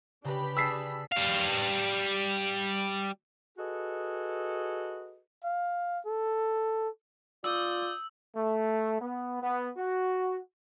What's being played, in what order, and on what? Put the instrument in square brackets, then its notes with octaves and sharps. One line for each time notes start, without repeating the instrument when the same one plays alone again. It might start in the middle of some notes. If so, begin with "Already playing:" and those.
[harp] C#3 B4 [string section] D4 G4 B5
[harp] G#4 D5 A5 [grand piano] E6 B6 C7
[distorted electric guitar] G3 F5
[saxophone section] F#4 G#4 A4 B4 D#5
[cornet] F5
A4
[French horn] F4 [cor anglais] D5 [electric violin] D#6 G6 [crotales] E6
[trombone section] A3
B3
B3
F#4